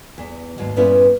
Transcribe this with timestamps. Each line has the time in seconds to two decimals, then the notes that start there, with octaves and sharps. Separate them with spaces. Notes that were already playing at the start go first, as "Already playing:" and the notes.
0.18 E2
0.58 D#2 G#2 F#3
0.76 G2 A#2 B3 C#4 E4 B4